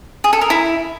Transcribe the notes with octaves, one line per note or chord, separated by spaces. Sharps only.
G#4
A4
A#4
E4